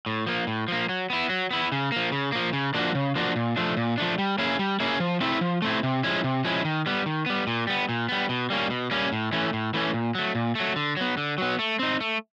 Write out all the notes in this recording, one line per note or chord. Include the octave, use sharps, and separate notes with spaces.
A2
F3 A#3
A2
F3 A#3
F#3
B3 E4
F#3
B3 E4
C#3
F3 A#3
C#3
F3 A#3
C#3
F3 A#3 D4 F#4
C#3
F3 A#3 D4 F#4
A#2
F3 A3 D4
A#2
F3 A3 D4
G3
A#3 C#4 E4 G#4
G3
A#3 C#4 E4 G#4
F3
A3 C4 E4
F3
A3 C4 E4
C3
F3 G#3 C#4 E4
C3
F3 G#3 C#4 E4
D#3
G3 B3
D#3
G3 B3
A#2
G3 B3
A#2
G3 B3
B2
G3 A#3 C#4
B2
G3 A#3 C#4
A2
E3 A3 C#4
A2
E3 A3 C#4
A#2
F#3 A3
A#2
F#3 A3
D3
F#3 B3
D3
F#3 B3
A3
C4 D#4
A3